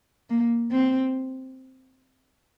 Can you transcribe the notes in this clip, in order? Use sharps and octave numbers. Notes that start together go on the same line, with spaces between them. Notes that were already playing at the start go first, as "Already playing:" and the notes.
A#3
C4